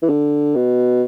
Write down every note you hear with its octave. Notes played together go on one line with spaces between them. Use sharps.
E3
D3
B2